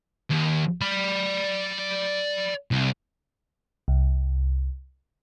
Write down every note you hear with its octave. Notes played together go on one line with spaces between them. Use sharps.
D#2
D5 B5
C2
C2